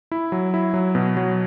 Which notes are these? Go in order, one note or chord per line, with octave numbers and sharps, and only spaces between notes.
E4
F#3
E4
F#3
B2
F#3